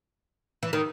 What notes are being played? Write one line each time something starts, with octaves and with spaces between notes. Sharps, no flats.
E3
D#3